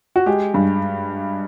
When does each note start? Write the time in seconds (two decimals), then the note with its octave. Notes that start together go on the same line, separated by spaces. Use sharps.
0.16 F#4
0.26 G#3 G4
0.54 G2